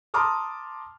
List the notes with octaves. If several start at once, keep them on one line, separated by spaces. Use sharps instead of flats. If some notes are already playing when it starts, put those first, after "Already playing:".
A5 A#5 C6 D6 D#6 F6